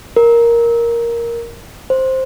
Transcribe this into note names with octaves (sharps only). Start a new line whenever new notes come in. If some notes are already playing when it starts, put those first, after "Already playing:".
A#4
C5